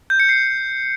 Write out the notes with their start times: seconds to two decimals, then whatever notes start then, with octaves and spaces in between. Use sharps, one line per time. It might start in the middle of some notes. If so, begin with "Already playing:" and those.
0.10 G6
0.20 C#7
0.29 C7